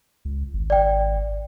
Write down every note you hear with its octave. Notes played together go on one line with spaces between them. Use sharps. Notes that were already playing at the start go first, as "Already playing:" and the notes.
C#2
G#1
D5 G5